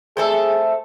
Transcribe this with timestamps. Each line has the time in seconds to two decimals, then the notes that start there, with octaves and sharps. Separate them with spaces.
0.17 C3 E3 A3 G#4 A4 C5